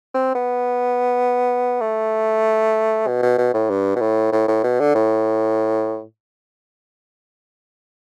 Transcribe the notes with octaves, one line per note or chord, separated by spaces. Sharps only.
C4
B3
A3
B2
B2
B2
A2
G2
B2
A2
A2
A2
B2
D3
A2